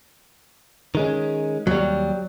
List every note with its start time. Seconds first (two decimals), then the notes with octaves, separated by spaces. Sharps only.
0.95 D#3 G#3 C#4
1.67 D#2 F#3 G3